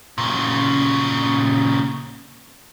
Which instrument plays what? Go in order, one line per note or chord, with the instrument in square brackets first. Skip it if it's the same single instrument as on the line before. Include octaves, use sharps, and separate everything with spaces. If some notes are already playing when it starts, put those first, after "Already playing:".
[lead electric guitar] A#2 C#3